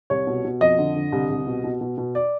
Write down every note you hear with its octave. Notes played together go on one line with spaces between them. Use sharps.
C2 C#5
B2
B2
F2 D#5
D3
D3
C2
C2
B2
B2
B2
B2
D5